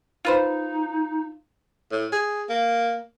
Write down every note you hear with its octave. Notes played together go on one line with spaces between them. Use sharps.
D#4 F4 B4 C5
A2
G#4
A#3